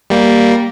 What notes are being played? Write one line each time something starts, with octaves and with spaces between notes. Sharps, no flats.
G3 A#3